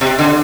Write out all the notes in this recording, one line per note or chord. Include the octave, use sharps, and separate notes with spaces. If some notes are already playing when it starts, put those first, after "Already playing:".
C3
D3